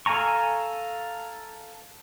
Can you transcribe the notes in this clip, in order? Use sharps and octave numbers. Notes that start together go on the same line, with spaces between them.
A4 F5 G#5 A#5 C#6